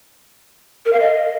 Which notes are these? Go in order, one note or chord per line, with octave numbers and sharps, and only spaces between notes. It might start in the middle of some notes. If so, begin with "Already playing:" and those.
A#4
F5
D#5